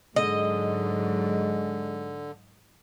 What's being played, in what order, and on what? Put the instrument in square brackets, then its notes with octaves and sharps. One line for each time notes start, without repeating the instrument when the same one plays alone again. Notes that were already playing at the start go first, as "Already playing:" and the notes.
[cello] G#2 F#3 [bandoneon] D3 [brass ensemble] G#3 [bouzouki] D#5